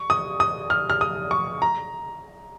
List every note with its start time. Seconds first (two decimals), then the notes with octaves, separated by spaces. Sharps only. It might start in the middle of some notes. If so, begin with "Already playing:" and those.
Already playing: C#6
0.10 D#6
0.40 D#6
0.70 F6
0.90 F6
1.01 D#6
1.31 C#6
1.62 A#5